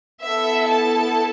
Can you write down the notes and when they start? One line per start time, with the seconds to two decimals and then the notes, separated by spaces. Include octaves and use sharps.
0.22 B3 E4 A4 E5
0.70 A5